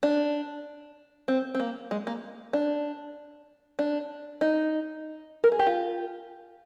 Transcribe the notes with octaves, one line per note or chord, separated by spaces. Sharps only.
D4
C4
C4
A#3
G#3
A#3
D4
D4
D#4
A#4
G#4
G4
F4